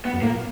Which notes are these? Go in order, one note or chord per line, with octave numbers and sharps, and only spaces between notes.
B3
F#2
A2 A#3
A#2